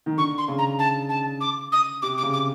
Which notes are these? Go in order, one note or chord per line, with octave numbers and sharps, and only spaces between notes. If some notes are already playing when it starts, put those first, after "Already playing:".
D#3
D3 C#6
C6
C#3
A#5
A5
A5
D6
D#6
C3 D6
D6
C#3
D6